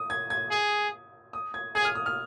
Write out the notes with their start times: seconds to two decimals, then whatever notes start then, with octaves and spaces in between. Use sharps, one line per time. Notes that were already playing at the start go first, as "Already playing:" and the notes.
Already playing: D#6
0.10 G#6
0.30 G#6
0.51 G#4
1.33 D#6
1.54 G#6
1.75 G#4 G#6
1.85 F6
1.95 D#6
2.06 F6